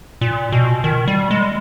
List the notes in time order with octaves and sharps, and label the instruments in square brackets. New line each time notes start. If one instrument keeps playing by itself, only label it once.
[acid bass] A#2
B2
D#3
G3
G#3